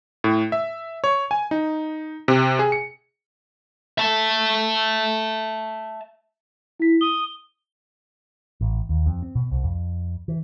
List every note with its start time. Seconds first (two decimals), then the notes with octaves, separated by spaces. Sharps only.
0.24 A2
0.52 E5
1.04 C#5
1.31 G#5
1.51 D#4
2.28 C3
2.59 G#4
2.72 C#7
3.98 E5 A5
6.80 E4 B6
7.01 D#6 G7
8.61 A1
8.89 D#2
9.06 F2
9.23 C4
9.35 B2
9.51 C2
9.64 F2
10.28 E3